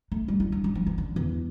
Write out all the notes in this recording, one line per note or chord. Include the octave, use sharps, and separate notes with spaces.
A3
G3
E4
D4
G3
F3
E3
D3
E2